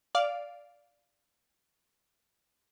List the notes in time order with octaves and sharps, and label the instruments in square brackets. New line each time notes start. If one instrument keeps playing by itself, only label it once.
[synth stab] D5 F5